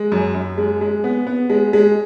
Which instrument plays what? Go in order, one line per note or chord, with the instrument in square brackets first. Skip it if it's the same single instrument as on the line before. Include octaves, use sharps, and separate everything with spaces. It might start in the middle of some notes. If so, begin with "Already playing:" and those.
Already playing: [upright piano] G#3
F#2
F#2
G#3
G#3
B3
B3
G#3
G#3